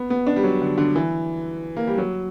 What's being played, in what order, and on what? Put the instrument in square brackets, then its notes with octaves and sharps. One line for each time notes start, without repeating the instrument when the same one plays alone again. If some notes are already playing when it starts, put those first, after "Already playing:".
Already playing: [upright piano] B3
B3
D4
G3
F#3
D3
D3
E3
A#3
G3
F#3